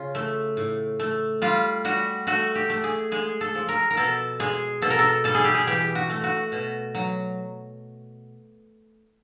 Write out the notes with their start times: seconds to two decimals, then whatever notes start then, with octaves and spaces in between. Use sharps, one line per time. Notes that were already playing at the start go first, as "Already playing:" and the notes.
Already playing: C#3 F4
0.15 A3
0.57 A2
1.00 A3
1.42 G3 F4
1.85 G3 F#4
2.27 A3 F#4
2.55 G4
2.70 A3
2.84 G#4
3.12 G#3 G#4
3.41 A4
3.55 F3
3.69 A#4
3.91 A#4
3.97 B2 A4
4.40 G#3 G#4
4.82 B2 A4
4.90 A#4
4.99 A4
5.24 G3 A4
5.35 G#4
5.44 G4
5.54 G#4
5.67 E3 G4
5.95 F#4
6.09 A3
6.24 F#4
6.52 B2
6.95 F#3